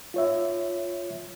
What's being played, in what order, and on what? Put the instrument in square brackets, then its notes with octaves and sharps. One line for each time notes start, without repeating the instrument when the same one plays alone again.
[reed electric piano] F4 C#5 E5